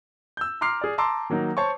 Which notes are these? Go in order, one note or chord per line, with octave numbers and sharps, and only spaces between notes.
E6 G6
A#5 C6 D6 F6 C7
G#4 D5
A5 A#5 C6 D6 E6
D#3 F#3 A#3 D#4
C5 C#5 A5 C#6